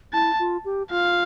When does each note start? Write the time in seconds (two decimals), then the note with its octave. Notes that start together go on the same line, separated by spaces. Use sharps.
0.13 E4 A5
0.39 F4
0.65 G4
0.90 F4 F5